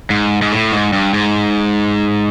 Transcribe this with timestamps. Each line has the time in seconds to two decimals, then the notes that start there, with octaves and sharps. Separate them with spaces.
0.10 G#2
0.42 G#2
0.52 A2
0.72 G#2
0.93 G2
1.14 G#2